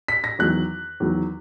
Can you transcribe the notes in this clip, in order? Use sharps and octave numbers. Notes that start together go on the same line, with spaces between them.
B6
A#6
E2 D#3 F#3 F#6
E2 D#3 F#3